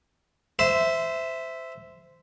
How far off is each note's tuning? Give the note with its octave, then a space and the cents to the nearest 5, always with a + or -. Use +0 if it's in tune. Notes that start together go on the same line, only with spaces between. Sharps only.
C5 -20 E5 +0